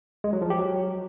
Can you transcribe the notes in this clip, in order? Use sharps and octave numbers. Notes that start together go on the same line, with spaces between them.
G#3
F#3
F3
G4
F#3